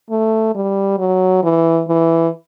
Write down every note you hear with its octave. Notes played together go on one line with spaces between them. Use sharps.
A3
G3
F#3
E3
E3